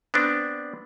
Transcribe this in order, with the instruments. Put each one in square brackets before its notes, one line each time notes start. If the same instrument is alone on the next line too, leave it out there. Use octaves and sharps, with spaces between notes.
[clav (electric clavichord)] B3 C4 D4